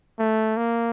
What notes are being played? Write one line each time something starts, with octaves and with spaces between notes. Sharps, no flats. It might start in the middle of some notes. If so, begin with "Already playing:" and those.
A3
A#3